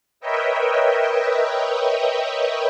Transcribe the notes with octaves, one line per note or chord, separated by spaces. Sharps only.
A#4 B4 C#5 D#5 E5 G5